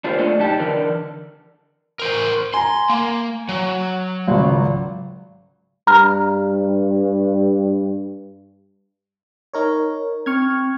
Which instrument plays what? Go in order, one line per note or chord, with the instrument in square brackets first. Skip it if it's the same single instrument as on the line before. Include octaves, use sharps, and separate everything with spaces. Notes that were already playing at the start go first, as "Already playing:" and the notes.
[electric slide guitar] D4 F4 G4 A#4 C5
A3 D4 F4 A4 D5 D#5
F#2 D#4 G4 A5
D3 E3 A#4 D5
[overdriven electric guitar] A#4 C5
[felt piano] G#5 A#5 [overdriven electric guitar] C6
[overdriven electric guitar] A#3
F#3
[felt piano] G#1 C#2
[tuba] G2 [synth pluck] A#5 F6
[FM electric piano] D#4 A#4 C#5
[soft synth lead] C4 [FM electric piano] C#6 F6 G#6